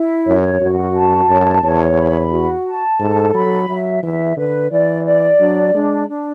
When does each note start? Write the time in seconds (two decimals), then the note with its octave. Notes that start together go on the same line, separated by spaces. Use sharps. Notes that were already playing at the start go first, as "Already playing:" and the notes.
Already playing: E4
0.26 F#2 C#5
0.60 F#2 F#4
0.95 A5
1.29 F#2 C#5
1.63 E2 C#5
1.97 B5
2.31 F#4
2.66 A5
3.00 G#2 A4
3.34 F#3 B5
3.68 F#3 E5
4.03 E3 E5
4.37 D3 B4
4.71 E3 D5
5.05 D5
5.40 F#3 D4
5.74 G#3 D4
6.09 D4